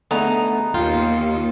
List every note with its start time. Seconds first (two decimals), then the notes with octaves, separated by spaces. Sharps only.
0.11 D3 A3 B3 D#4 G#4 A#5
0.74 D#2 F4 G5